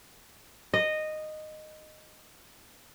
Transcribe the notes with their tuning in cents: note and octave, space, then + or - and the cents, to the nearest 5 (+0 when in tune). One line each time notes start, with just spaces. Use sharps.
D#5 -10